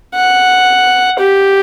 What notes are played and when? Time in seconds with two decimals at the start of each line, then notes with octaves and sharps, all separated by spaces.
0.16 F#5
1.20 G4